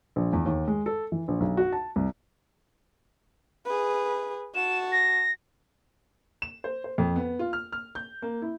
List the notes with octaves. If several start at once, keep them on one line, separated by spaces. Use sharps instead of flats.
A#1
E2
D#2
G#3
A4
E3
A#1
B1
F#4
A5
C2
G#4 B4
F#4 A5 E7
A#6
E7
C5
C5
F2
B3
F4
F6
F6
G6
A#3
E4